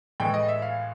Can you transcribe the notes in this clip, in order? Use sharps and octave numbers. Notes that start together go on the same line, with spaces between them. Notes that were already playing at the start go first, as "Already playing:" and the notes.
A2 E3 G#3 G5
D#5
E5
F5